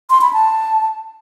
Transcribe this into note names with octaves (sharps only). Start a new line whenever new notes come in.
C6
B5
A5